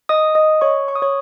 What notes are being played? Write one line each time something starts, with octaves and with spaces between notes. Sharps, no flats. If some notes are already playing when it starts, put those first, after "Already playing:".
D#5 D#6
D#5 D#6
C#5 C#6
C#6
D#6
C#5 C#6